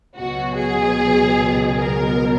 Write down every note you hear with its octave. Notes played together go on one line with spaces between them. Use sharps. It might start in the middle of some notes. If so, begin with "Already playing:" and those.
C#2 B2 F#3 F#4
G#4
A#4